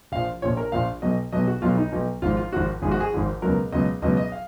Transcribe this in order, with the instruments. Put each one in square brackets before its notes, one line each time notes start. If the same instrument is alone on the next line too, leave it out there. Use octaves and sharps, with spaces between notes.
[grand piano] A#1 A#2 F3 F5
A#1 A#2 F3 C#5
A#4
A#1 A#2 F3 F5
B1 B2 F#3 D#5
B1 B2 F#3 D#5
F#4
B1 B2 F#3 F4
D#4
B1 B2 F#3
G#1 G#2 F3 F4
F4
G#1 G#2 F3 F#4
G#1 G#2 F3 G#4
F#4
G#4
G#1 G#2 F3
C#2 B2 F#3 A#4
C#2 B2 F#3 D#5
C#2 B2 F#3 D#5
D#5
F5